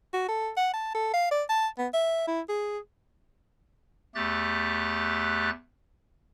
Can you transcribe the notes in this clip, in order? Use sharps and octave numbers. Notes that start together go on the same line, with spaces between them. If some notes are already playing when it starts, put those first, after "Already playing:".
F#4
A4
F#5
A5
A4
F5
D5
A5
B3
E5
E4
G#4
E2 A3 G4 F#6 A6